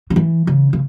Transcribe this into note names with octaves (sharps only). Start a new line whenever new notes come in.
C#3
E3
C#3
C#3